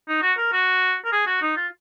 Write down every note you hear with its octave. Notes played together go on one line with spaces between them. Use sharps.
D#4
F#4
A#4
F#4
A#4
G#4
F#4
D#4
F4